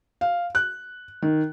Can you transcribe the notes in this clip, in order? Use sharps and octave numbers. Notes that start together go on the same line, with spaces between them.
F5
F#6
D#3